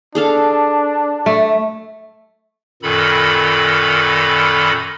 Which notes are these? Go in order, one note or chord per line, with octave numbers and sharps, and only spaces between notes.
D4 G#4 A4 F5
A3 E5
F#2 A#2 D#3 A4 B5